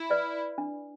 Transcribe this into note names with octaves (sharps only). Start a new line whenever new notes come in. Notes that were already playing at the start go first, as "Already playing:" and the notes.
Already playing: E4
B4 D5
D4